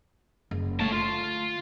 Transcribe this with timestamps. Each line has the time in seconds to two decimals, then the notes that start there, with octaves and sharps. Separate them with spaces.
0.51 F#1
0.80 D3 A3 C#5 A5
0.92 F4